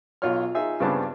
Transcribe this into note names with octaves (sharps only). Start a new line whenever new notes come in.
B1 F4 F#4 C#5 F6
D#4 F4 G#4 E5
G2 C#3 B3 C4 D4 A5